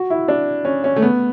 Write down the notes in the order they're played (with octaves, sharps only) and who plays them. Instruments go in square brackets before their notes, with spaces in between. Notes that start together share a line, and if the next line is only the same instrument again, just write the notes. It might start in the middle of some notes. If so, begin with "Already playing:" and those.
Already playing: [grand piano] F#4
E4
D4
C#4
C#4
A3
B3